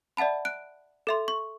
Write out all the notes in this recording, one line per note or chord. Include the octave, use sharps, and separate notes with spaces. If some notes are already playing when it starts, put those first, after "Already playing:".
D5 E5 F#5 A5 B5
F#6 D7
A4 E5 C6
C#6